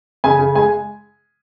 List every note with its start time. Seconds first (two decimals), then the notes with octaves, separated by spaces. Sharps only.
0.24 C#3 G#5
0.39 C#3
0.55 G#3 G#5